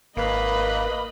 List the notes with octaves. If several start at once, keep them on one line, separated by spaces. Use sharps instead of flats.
G#1 A#3 B4 D#5 B5